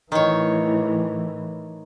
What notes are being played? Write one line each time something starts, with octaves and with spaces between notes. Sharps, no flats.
A2 D#3 E3 C#5